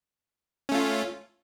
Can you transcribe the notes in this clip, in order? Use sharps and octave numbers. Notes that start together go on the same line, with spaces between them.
A3 C#4 F4